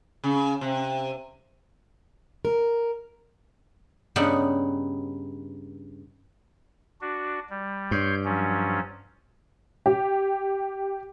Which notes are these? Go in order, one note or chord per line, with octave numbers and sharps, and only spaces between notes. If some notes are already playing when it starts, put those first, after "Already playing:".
C#3
C3
A#4
G2 C#3 B3 D#4 F#5
D4 F#4
G3
G2 C#5 C6 G6
F3 F#3 C#4
G4